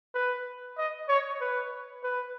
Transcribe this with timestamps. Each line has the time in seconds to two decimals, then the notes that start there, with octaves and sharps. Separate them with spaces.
0.15 B4
0.78 D#5
1.09 C#5
1.41 B4
2.03 B4